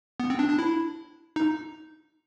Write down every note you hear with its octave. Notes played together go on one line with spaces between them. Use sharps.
B3
C4
D4
D4
E4
D#4